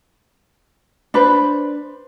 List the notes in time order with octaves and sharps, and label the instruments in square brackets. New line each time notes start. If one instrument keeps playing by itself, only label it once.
[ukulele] D4 B4 C5